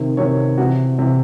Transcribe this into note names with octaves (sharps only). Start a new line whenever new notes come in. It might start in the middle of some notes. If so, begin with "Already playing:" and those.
Already playing: C3 D#3
C3 D#3 C#5
C3 E3 F#4
C3 E3